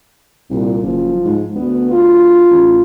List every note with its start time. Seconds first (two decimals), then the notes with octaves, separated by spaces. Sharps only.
0.50 C2 A#2
0.83 F#1 F3
1.25 G#2
1.55 D2 B3
1.91 F4
2.51 A1